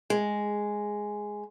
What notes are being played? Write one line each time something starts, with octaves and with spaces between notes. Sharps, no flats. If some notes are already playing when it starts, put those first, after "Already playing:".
G#3